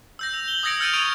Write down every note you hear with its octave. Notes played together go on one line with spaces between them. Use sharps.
E6 G6 A#6
F7
F#7 G7
D#6 E6 G#6 A#6 C#7 D7
F6 G6 A6 D7 D#7 F7
C#6 G#6 A6 D7 D#7 F7